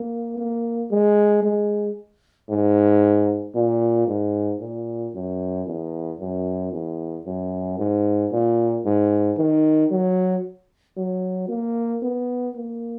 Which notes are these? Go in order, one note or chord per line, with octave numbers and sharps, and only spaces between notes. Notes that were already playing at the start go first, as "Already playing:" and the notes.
Already playing: A#3
A#3
G#3
G#3
G#2
A#2
G#2
A#2
F#2
E2
F#2
E2
F#2
G#2
A#2
G#2
D#3
F#3
F#3
A#3
B3
A#3